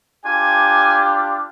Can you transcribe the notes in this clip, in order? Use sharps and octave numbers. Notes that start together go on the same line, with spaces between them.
D4 F4 G4 G#5